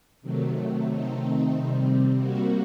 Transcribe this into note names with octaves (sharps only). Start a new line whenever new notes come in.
C3 D#3 F#3 A3
D#3 A3 C4 D#4
C3 G3 C4
C3 G3 A#3 F#4